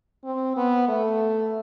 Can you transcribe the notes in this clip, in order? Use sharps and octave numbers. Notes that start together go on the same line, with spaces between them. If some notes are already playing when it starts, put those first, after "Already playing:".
C4
B3
A3